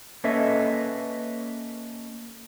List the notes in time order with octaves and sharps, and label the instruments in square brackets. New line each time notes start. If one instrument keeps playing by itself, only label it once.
[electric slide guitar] A#3 C#4 A4 B4 D#5 E5